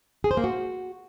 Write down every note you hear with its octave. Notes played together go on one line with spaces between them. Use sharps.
G#4
C5
A#3
F#4